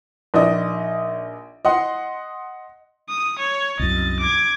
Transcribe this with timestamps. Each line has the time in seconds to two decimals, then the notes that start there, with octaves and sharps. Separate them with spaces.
0.34 A#1 D#4 D5 D#5
1.65 D#5 F#5 C6
3.09 D#6
3.39 C#5
3.79 C2 F#2 D#5 A6
4.20 D6 G#6